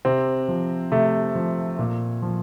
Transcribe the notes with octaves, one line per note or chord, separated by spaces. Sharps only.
C3 C4
F3
C3 A3
F3
A#2
F3